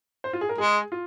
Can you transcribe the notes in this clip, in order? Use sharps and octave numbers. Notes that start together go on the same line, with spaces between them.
C5
F4
G#4
A#4
G#3 G#4
F4